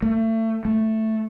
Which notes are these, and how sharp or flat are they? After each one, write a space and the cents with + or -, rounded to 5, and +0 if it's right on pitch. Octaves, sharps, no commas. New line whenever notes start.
A3 +30
A3 +5